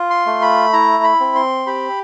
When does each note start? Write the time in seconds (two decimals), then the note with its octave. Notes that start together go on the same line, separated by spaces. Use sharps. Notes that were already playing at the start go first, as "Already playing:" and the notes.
Already playing: F4
0.10 C6
0.26 A3
0.42 B5
0.73 E4 A#5
1.04 B5
1.20 C4
1.35 C6
1.66 G4 B5